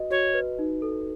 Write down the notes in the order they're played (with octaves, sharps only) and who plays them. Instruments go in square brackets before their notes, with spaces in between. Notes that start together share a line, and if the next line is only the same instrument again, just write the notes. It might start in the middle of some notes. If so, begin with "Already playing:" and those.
Already playing: [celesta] F#4 B4 D#5
[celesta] F#4 [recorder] C#5
[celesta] B4
D#4
A4